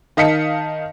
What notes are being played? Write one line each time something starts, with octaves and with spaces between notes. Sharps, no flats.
D#3 D#5 F5 A5 B6 C#7